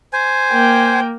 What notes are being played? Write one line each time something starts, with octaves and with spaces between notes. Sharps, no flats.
C5 G#5
A#3 G5